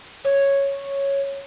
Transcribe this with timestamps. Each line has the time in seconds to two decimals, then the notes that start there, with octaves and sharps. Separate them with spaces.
0.25 C#5